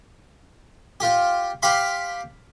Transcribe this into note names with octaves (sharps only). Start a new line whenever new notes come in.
F4 G4
G4 F5 B5 C6